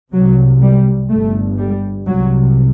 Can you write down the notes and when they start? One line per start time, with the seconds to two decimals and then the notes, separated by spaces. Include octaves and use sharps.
0.12 C2 C3 F#3
0.61 G3
1.09 G1 G2 A3
1.58 G3
2.06 C2 C3 F#3